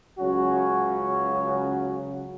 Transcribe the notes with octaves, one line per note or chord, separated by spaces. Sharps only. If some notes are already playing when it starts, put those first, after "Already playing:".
C#2 C#3 F#3 C#4 F#4